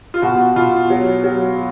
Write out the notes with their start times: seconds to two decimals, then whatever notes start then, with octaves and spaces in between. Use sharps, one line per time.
0.14 F4
0.22 B2 F#4
0.56 B2 F4
0.90 F#3
1.24 F#3